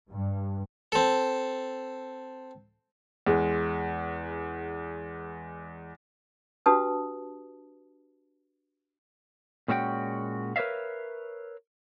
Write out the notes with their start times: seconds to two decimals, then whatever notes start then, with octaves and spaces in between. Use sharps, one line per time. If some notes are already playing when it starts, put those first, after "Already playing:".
0.11 G2
0.92 C4 A4
3.27 E2 G#3
6.66 D4 F#4 G4 B4 A5 D#6
9.68 A#2 G#3 C#4 E4 F#4 G5
10.56 A#4 B4 C#5 D5 E5 F5